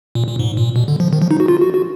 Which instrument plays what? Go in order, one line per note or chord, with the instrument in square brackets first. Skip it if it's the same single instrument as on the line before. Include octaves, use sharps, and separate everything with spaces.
[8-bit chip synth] A#2
A#2
G#2
A#2
B2
D3
F3
D#3
F3
D#4
F#4
F4
F#4
F#4